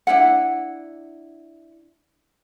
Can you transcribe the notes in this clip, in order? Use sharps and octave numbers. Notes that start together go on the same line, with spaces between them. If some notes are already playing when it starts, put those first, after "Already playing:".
D4 E4 F4 F#5